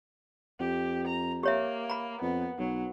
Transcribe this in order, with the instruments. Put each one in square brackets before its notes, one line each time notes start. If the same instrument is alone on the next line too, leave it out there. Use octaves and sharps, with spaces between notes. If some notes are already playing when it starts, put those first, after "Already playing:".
[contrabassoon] F2 [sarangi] G4
[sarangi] A#5
[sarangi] A#3 [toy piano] G4 C#5 E5
[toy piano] A#5 B5
[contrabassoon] F2 [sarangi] B3
[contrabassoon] B1 [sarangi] F#3